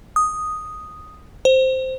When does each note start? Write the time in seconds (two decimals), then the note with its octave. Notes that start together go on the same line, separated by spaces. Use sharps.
0.16 D#6
1.45 C5